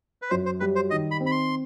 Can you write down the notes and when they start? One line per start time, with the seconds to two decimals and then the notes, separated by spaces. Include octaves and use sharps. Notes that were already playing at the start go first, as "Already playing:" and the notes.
0.22 B4
0.30 F#2 C5
0.46 C5
0.60 G3 B4
0.76 C5
0.90 D#3 D#5
1.11 B5
1.20 C4
1.26 B5
1.31 C6